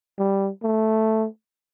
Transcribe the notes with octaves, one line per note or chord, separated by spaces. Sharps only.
G3
A3